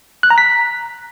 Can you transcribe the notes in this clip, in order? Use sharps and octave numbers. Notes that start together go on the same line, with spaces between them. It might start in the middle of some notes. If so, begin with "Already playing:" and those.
F#6
A#5
B6